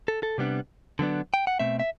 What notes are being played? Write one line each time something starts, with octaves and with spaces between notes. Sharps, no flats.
A4
A4
C3 G3 B3 D4
D3 F#3 B3 D4
G5
F#5
B2 A3 C4 E5
E5